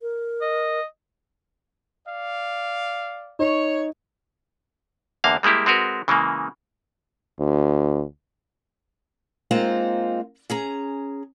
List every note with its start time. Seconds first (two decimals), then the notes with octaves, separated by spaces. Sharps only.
0.02 A#4
0.41 D#5
2.06 D5 F5
3.39 D#4 C#5
5.24 E2 D3 A#3 F5
5.43 G3 G#3 A#3 E4 G4
5.66 G#3 C4 F#4 A#4 B4
6.08 C#3 E3 G#3 A#3
7.39 D2
9.51 G#3 A#3 C4 D#4 F4 C5
10.50 C#4 G#4 A#5